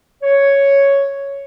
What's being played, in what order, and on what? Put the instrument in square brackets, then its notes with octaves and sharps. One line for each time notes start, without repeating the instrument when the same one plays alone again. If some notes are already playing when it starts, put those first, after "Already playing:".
[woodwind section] C#5